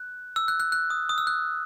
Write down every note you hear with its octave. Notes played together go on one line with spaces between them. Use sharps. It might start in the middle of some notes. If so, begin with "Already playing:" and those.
Already playing: F#6
E6
F#6
F#6
F#6
D#6
D#6
E6
F#6